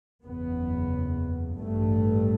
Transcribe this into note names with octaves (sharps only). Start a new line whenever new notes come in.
F#1 E2 C#3 B3
G2 A3
A1